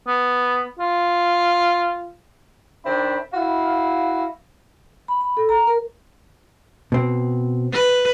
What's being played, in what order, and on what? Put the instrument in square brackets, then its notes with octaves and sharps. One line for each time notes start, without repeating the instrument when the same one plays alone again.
[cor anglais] B3
F4
[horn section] D#3 C4 D4 E5 B5
E4 F#4 F5
[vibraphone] B5
B5
A4
A#5
A#4
[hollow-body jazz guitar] B2 C4
[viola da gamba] B4